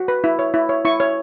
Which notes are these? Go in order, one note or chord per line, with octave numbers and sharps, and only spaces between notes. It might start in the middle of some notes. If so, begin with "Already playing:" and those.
Already playing: F#4
B4
E4
C#5
E4
C#5
E4 C#6
C#5